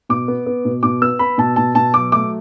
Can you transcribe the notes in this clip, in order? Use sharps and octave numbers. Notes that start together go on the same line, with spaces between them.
B2 D6
B3
B3
B2
B2 D6
B3 E6
B3 B5
B2 A5
B2 A5
B2 A5
F#3 D6
A3 D6